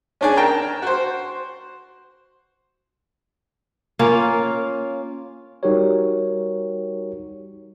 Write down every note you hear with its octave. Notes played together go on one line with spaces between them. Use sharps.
C#4 D4 G#4
A#4 G5 A5 A#5
F#4 C5
A#3 C#4 F4
G3 D#4 F#4 G4 A#4 C#5